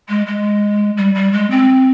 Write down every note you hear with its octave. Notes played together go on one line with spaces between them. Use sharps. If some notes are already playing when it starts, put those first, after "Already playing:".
G#3
G#3
G3
G3
G#3
C4